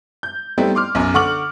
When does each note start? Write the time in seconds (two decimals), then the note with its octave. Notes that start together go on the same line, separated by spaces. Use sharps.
0.23 G6
0.58 G3 A3 B3 C4 D#4 E4
0.75 C6 D6 F6
0.95 B1 F#2
1.14 D3 F#5 C#6 D6 F6 F#7